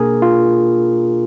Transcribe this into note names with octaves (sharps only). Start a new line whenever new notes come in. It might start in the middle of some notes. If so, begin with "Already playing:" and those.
Already playing: B2 A#3 D4 G#4 A#4
F4